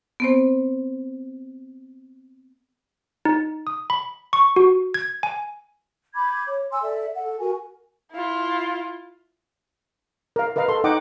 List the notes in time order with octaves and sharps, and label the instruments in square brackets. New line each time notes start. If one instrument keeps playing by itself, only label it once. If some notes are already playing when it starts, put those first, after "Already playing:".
[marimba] B3 C4 C5
[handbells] D#4
D#6
B5
C#6
F#4
G#6
G#5
[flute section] B5 D6 G6 G#6
C#5
G#5 C6 E6
A4 D5 E5
A4 F#5
F#4 A#4 G#5
[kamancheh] E4 F4
[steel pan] A#4 F5
A#4 B4 D#5 F5
A4 C6
D#4 D#5 F#5 G5 D6